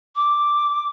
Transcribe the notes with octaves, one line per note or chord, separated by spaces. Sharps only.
D6